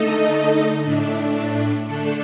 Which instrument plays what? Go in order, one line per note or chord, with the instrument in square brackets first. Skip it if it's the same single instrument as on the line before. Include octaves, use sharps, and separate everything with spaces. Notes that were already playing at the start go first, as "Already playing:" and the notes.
Already playing: [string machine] D3 A3 D#4 A4 D#5
A2 A3 D4
D3 A3 D4 A4